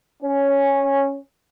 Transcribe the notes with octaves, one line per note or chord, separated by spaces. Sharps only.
C#4